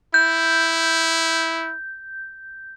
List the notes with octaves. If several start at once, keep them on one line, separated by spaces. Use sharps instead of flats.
E4 G6